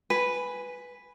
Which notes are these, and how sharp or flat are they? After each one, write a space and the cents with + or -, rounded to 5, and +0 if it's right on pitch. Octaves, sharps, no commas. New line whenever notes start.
B4 +0 G#5 +0